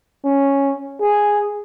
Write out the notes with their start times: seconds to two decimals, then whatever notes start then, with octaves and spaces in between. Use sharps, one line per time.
0.24 C#4
1.01 G#4